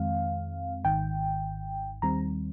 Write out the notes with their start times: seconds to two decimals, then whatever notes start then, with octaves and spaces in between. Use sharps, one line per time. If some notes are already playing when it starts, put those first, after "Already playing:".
Already playing: F2 D#3 G#3 C4 F5
0.84 G#1 G#2 D#3 G5
2.02 D#2 D#3 G3 C4 A#5